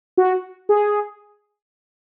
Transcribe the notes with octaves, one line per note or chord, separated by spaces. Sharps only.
F#4
G#4